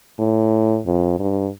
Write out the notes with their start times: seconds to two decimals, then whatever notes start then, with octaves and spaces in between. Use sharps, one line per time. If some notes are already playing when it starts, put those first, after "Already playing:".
0.19 A2
0.86 F2
1.19 G2